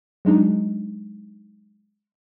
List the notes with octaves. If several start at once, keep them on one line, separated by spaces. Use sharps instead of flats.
F#3 G#3 D4 D#4